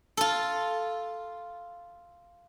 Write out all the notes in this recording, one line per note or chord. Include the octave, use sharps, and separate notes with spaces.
F4 A4